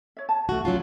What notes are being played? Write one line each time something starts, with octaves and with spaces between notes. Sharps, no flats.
C#5 E5
A5
A3 F#4
F#3 C#4 F4